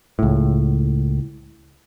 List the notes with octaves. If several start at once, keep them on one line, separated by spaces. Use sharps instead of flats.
C#2 A2